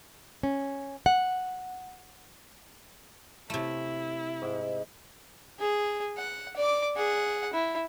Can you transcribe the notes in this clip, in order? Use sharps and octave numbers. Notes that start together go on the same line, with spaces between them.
C#4
F#5
C3 A3 E4
G#2
G#4
F#5
D5 D6
G#4 F#5
E4